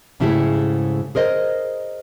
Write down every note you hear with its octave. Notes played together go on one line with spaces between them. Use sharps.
G#2 C#3 A3 E4 G4 G#4
G#4 A#4 C5 D#5